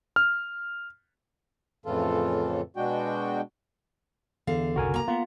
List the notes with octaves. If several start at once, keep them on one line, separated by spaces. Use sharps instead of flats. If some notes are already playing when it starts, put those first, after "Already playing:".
F6
F2 A2 C#3 E3 F4 A4
B2 G#3 D4 F#4 G5
E2 D3 F5
F#1 C2 F#4 A#4 G#5
A#3 A#5
B3 F4